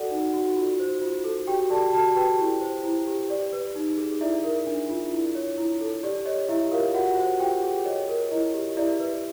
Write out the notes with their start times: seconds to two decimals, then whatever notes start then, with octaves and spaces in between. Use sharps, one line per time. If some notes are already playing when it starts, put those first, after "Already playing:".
Already playing: F#4 A4 D5 F#5
0.11 D#4
0.34 F#4
0.56 F4
0.80 C5
1.02 F4
1.24 A4
1.47 F#4 G4 G5
1.70 A4 D5 A5
1.93 F#4 A4 A5
2.16 G4 B4 G5
2.39 E4
2.61 C5
2.84 E4
3.07 G4
3.30 D5
3.52 B4
3.76 D#4
3.98 G#4
4.21 E4 D5 E5
4.44 A#4
4.67 D4
4.90 F4
5.12 E4
5.35 C#5
5.58 E4
5.81 A4
6.03 G4 D5
6.26 C#5 D#5
6.49 E4 G4 E5
6.71 F4 A#4 F5
6.94 F4 F#4 F#5
7.17 C5
7.40 F4 G4 G5
7.63 G#4
7.85 C#5 D#5
8.09 A#4
8.31 E4 D#5
8.53 G4
8.77 E4 D5 E5
9.00 B4